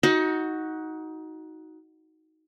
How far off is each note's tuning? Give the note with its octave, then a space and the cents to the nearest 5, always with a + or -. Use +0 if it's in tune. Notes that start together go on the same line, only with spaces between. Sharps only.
D#4 +20 F#4 +0